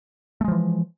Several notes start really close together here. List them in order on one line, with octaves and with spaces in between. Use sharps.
A3 G#3 F3 E3